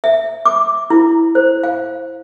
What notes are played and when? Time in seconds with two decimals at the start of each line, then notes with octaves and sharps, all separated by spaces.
0.04 E5
0.45 D6
0.90 E4
1.35 C5
1.63 F5